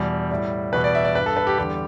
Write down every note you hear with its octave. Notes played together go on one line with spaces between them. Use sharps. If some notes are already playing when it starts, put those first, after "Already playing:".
Already playing: E2 B2 G3
A2 G3
E2 B2 G3 B4
D5
E5
D5
G2 G3 B4
A4
B4
G4
E2 D3 G3 G4